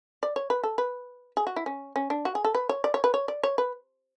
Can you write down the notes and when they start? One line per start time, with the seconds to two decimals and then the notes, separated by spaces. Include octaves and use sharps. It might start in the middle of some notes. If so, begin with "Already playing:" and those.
0.23 D5
0.36 C#5
0.50 B4
0.64 A4
0.78 B4
1.37 G#4
1.47 F#4
1.56 E4
1.66 C#4
1.96 C#4
2.10 D4
2.25 F#4
2.35 G#4
2.45 A4
2.55 B4
2.69 C#5
2.84 D5
2.94 C#5
3.04 B4
3.14 C#5
3.28 D5
3.43 C#5
3.58 B4